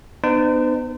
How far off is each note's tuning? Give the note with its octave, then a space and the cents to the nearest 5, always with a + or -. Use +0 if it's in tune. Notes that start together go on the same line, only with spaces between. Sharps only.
B3 +0 D#4 -45 C5 -40